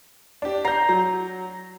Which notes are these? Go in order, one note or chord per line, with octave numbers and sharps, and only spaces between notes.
D4 G4
A#5 G6 C7
F#3